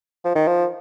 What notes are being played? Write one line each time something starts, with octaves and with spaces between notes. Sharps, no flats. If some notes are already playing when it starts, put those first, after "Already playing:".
F3
D#3
F3